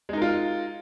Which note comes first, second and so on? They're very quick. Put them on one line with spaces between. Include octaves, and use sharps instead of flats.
G#3 D#4 A#4 F4